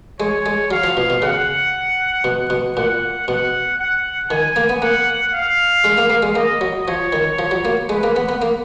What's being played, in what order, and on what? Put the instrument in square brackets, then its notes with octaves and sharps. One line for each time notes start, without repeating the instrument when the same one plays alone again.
[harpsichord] G#3 [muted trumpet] C#5
[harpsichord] G#3
[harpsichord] F#3 [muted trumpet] F5
[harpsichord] F3
B2
B2
[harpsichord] C#3 [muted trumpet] F#5
[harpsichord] B2
B2
[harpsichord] A#2 [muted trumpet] F#5
[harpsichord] B2 [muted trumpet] F#5
[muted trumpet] F#5
[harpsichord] D#3 [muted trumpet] G#5
[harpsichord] A#3
B3
[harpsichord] A#3 [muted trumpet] F#5
[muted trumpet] F5
[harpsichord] G#3
A#3
A#3
G#3
[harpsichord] A#3 [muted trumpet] D#5
[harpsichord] F#3
[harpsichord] F3 [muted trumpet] C#5
[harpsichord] D#3
F3
F#3
A#3
[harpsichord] G#3 [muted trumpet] B4
[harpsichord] A#3
B3
B3
A#3